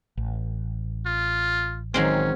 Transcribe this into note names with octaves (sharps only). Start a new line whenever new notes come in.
A1
F4
D#3 F#3 G#3 C4 C#4